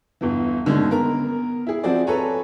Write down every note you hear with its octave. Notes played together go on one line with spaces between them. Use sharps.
G1 E2 E3
B2 D3 D#3 G#3 A#3 C#4
B3 A#4 A#5
E4 G#4
F3 C4 F#4 G#4 D5
A4 B4 C#5 G#5 A#5